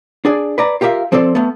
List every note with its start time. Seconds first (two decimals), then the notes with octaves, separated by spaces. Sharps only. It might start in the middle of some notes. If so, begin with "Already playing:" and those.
0.25 D4 G#4 D5
0.58 B4 D5 A#5
0.81 F4 G4 A#4 D5 E5 F5
1.12 F3 C4 A4 D5 C6
1.35 A3 B3